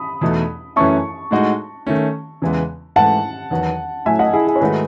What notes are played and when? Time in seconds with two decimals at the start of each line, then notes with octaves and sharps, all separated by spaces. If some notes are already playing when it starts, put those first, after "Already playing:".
Already playing: B5 D#6
0.21 E2 B2 A3 D#4
0.76 F#2 E3 A3 C#4 E4 A5 C#6
1.31 A2 G#3 D#4 F#4
1.86 D#3 A3 C#4
2.42 E2 C#3 E3 G#3 B3
2.96 G#2 E3 A3 E4 F#5 A5
3.51 E2 D#3 F#3 B3 F#4
4.05 A2 F#3 A3 E4 E5 G#5
4.19 D#5 F#5
4.33 E4 G#4
4.47 E4 G#4
4.56 C#5
4.61 G#2 D#3 A3 D#4 F#4 G#4 B4